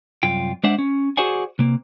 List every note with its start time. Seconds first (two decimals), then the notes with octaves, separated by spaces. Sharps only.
0.23 C2 F#2 F4 G5
0.64 G#3 D4 C5 D5 E5 F#5
0.78 C#4
1.17 F#4 G#4 C5 D5 F#5 G#5
1.59 C3 A#3